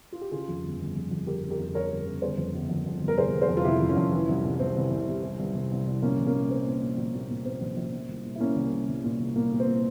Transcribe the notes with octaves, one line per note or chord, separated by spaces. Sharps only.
F4
G4
C#3 F4 G#4
F2
G1
G1
F2
F2
C#3 G4 A#4
C#3
G4 A#4
F2
C#3 A#4 C#5
G1
C#3
G1 G#4 C5
F2
G1
F2
F2
G1
A#4
C3 G#4 C5
G1
G#4 C5
F2
F4
C3 E4 G4
F2
C#4 F4
F2
E3
C2
C2
C2 C4
C2
C2
C3
C3
C2
C2
C2
C2
A#1 A#3 C#4
A#1
A#3 C#4
A#2
A#2 C4
A#2
A#2
A#1
A#2
A#2
A#2 C4
A#1
A#1
A#2
C2
A#2
E4
A#2 A#3 C#4
C2
C2
C2
A#2
C2
A#2 A#3
A#2
C4
A#2